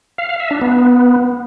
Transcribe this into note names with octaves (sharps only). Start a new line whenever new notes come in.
F5
F5
E5
D4
B3